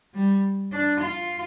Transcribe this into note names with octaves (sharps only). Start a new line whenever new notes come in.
G3
D4
F4